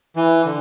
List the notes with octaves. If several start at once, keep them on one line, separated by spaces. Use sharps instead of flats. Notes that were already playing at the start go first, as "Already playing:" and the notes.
E3
D3